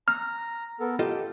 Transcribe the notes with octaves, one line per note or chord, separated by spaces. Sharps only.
A#5 F6
B3 A4 A#4
F4 G4 A4 D#5 G5